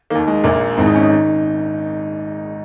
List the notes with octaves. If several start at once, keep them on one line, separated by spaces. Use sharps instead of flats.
D#2 D#3 A#3
G#3
A#1 A#2 A#3
G#1 G#2 D#3 C4
D#4
C#4
D#4
D#3